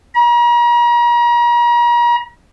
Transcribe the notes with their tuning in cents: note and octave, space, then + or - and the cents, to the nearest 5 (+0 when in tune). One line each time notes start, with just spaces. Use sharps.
A#5 +40